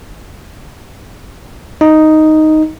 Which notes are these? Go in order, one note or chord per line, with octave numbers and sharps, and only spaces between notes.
D#4